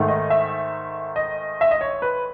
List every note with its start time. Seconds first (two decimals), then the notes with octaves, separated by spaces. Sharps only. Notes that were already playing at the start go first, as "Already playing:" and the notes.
Already playing: G#2 D#3 A3 D#4
0.08 D#5
0.30 E5
1.16 D#5
1.61 E5
1.71 D#5
1.81 C#5
2.02 B4